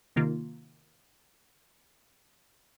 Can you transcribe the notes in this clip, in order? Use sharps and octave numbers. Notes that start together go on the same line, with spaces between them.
C3 D#3 A#3 F4